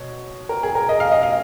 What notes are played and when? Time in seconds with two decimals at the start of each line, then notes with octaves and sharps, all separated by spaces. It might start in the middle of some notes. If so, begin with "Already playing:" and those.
Already playing: B2 C#5
0.49 A#4
0.63 G#4
0.75 A#4
0.89 D#5
1.00 F5
1.12 D#5
1.23 F5